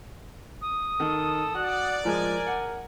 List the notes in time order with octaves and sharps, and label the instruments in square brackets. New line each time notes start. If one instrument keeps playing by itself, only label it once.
[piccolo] D#6
[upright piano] D#3 [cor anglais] A4
[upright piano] F#4 [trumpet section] D5 [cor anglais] F#5
[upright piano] F3 G#3 [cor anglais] A#4 [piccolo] G#5
[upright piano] F#5